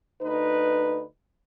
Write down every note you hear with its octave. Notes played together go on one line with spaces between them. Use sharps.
D2 D#4 B4